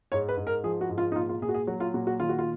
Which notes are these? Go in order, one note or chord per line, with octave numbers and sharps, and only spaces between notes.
G#2 C#5
B4
G#2
A#4
F3 G#4
F#4
G#2
F4
D#4
A#2 F4
F4
A#2 G#4
F#4
G#4
F#3 F#4
F4
A#2 F#4
F#4
D#3 F4
F#4
F4